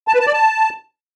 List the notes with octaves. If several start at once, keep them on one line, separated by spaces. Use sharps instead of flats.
A5
B4
A5
D5
A5